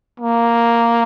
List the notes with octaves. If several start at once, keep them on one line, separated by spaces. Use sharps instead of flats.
A#3